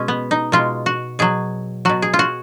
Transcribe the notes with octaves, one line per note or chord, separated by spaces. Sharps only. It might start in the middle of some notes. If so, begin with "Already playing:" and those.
Already playing: B2 G#3 C#4
B3
D#4
B2 G#3 F4
F#4
B2 F#3 G#4
B2 F#3 F#4
G#4
F4
F#4